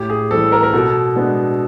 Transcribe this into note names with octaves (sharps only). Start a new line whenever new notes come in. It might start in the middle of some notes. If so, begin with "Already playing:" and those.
Already playing: A2 G4
G#4
E3 G3 C4 A4
A#4
A#4
B2 A4
G#3 B3 D4